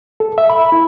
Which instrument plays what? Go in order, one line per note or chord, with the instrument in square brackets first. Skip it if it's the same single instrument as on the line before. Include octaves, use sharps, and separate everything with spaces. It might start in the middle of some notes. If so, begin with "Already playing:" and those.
[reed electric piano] A4
E5
B5
E4